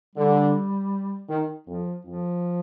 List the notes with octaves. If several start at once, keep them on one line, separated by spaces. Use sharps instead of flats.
D3 G3
D#3
F2 F3
F2 F3